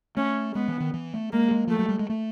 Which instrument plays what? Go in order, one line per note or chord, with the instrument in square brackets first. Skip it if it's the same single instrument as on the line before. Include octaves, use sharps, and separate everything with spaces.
[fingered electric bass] A3 [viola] C#4
[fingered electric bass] G#3 [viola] B3
[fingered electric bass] E3
D#3
E3
A3
[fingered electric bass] G#3 [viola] A#3
[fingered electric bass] G#3
[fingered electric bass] F3 [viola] A3
[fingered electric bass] F#3
G3
G#3
A3